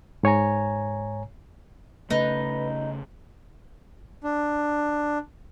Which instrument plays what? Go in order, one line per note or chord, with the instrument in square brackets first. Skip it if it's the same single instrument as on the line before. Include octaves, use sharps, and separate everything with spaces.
[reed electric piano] G#2 C#5 G#5 A#5
[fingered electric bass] C#3 A3 [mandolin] D#4 [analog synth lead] B4
[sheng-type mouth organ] D4